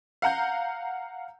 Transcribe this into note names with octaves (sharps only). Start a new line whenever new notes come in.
F5 F#5 A#5 G6